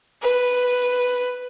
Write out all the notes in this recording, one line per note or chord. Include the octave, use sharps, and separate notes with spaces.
B4